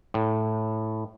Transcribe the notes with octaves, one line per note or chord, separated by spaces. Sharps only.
A2